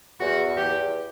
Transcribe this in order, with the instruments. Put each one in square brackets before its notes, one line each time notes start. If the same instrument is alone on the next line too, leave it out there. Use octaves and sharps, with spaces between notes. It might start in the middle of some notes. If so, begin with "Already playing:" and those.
[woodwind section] E2 [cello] F#4
[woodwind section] E2
[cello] G4
[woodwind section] E2